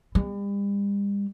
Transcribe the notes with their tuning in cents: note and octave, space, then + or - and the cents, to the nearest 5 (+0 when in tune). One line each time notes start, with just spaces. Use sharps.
G3 +40